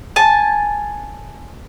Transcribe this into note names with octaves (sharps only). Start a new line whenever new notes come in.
G#5 A5